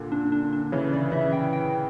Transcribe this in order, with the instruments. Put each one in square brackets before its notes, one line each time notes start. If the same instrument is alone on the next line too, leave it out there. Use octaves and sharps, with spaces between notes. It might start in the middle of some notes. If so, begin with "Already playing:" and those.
Already playing: [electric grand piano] A#2 D3
[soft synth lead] D4
D4
D4
[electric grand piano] C#3 E3 [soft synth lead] C#5
[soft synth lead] D5
[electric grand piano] C#3 E3 [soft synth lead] E5
[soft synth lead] G5
G5